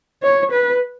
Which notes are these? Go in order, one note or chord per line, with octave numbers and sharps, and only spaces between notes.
C#5
B4